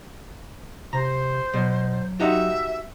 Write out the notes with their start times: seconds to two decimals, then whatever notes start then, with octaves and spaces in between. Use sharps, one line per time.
0.93 C3 C5 A#5
1.54 B2 F#3
2.20 D#4 F#4 G4 E5